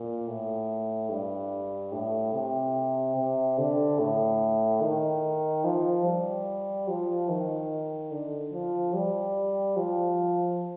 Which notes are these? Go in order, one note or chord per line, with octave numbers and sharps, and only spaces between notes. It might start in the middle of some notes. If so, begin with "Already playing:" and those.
Already playing: A#2
A2
G2
A2
C3
C3
D3
A2
D#3
F3
G3
F3
D#3
D3
F3
G3
F3